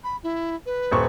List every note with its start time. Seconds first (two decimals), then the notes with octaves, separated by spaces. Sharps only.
0.04 B5
0.23 E4
0.66 B4
0.91 D#1 C5 C#6